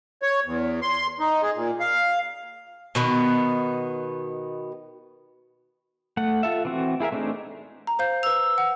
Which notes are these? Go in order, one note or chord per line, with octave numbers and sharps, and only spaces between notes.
C#5
E2
C6
D#4
G#4
A#2
F5
B2 D#3 B3
A3 F#5
F4 A4 E5
E3 C4 F#4
E4 G#4 A#4 E5
A3 C4 D4 D#4 G#4
A#5
C5 F5 G6
B4 E6 F7
F#5